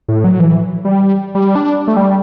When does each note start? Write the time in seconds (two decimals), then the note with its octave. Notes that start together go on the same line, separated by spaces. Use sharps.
0.08 A2
0.24 F#3
0.39 E3
0.85 G3
1.35 G3
1.55 D4
1.87 A3
1.97 G3